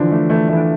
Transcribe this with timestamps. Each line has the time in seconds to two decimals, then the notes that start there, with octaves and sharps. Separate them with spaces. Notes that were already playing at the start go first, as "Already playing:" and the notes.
Already playing: D3 E3 F3 D4
0.11 A3
0.30 E3 A3
0.48 E3 A3
0.57 D3